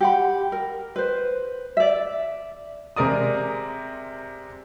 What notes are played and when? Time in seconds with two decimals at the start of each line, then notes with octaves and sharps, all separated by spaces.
0.01 G4 F#5 B5
0.52 A#4
0.96 B4 C5
1.77 D5 E5
2.96 C3 G#3 A#4 D5 D#6